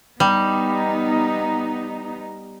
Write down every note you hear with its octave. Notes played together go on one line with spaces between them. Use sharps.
G3 B3 D#4